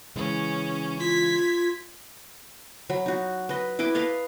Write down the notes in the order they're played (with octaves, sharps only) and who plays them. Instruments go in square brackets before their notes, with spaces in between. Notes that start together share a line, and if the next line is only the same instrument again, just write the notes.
[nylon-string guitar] C#3 E3 G#3 [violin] C#4
[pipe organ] F4 [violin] G#6 B6
[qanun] F#3 B5
D#4 F#4
B4 D#5
E4 B4 D#5 D6
B4 D#5 F5 A5